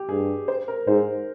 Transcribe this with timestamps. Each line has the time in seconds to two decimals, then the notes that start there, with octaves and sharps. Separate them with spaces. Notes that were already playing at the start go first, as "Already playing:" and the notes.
Already playing: G4
0.09 G2 G#4
0.48 C5
0.68 A#4
0.87 G#2 C5